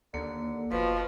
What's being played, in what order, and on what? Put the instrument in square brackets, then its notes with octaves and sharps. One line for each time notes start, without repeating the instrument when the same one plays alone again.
[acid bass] D#2 [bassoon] D3 [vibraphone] A#3
[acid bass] F#1 [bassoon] B2 [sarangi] F3 [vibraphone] B4